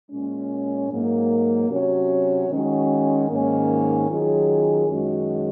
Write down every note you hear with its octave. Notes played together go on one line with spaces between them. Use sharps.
A#2 G#3 C#4
G#2 F#3 A#3
C3 F#3 C#4 F#4 C#5
D#3 G#3 C#4 F#4
G#2 D#3 A#3 C#4
D#3 F#3 C#4 F4 G#4
F#2 D#3 G#3 C#4 F#4